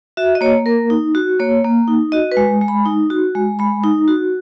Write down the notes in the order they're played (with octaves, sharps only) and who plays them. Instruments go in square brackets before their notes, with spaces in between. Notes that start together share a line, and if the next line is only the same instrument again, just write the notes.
[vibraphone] F#4 E5
D#5
A#3 C#5
A#3 A#4
D#4
F#4
A#3 C#5
A#3
D#4
F#4 D#5
B4
G#3
G#3
B5
D#4
F#4
G#3
G#3 B5
D#4
F#4